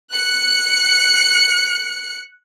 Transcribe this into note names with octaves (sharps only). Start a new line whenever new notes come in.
F#6 C#7